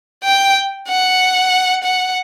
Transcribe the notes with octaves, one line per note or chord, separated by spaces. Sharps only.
G5
F#5
F#5